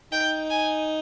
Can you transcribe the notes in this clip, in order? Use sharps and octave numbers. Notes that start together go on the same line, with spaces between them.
D#4 G5
G#5